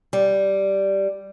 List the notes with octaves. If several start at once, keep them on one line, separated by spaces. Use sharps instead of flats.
G3